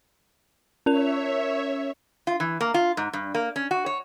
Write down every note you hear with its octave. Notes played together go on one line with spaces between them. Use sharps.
C#4 A#4 C#5 E5 F7
F4
E3
A#3
F4
G#2
G2
A#3
C#4
F#4
C#5